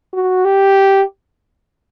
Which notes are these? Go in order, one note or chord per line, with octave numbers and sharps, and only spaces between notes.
F#4
G4